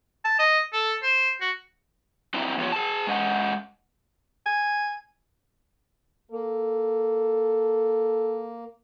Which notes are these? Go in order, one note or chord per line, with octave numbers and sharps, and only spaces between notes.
A5
D#5
A4
C5
F#4
F#3 C4 D#4 E4
F3 B3 F4 G4 C#5
G#4 A5
G#3 C#4 D#5 F#5
G#5
A#3 A4